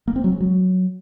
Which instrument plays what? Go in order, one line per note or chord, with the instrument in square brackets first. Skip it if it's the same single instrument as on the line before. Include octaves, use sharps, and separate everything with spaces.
[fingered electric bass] A#3
C4
F#3
G#3
F#3